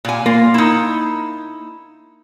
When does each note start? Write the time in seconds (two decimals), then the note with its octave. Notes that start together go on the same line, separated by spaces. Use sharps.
0.05 A#2 G#5
0.26 A#3 F4
0.54 D#4 E4